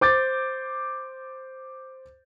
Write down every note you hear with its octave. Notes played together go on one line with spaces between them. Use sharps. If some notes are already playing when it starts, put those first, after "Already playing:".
C5 D6 G6 A6